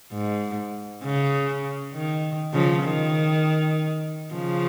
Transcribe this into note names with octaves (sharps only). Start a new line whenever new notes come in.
G#2
C#3
D#3
C#3 F3
D#3
C#3 F3